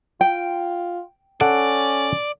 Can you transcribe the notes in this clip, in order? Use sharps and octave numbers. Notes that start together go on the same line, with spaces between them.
F4 G5
C#4 A4 D5 F#5